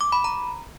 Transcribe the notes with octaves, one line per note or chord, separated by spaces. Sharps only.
D6
B5
A#5